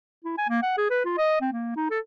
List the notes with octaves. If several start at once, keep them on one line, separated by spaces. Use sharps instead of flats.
E4
G#5
A#3
F#5
G#4
B4
F4
D#5
C4
A#3
D#4
A4